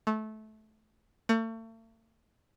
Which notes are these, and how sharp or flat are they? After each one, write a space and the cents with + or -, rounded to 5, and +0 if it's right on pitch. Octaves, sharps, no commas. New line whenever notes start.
A3 -20
A3 +40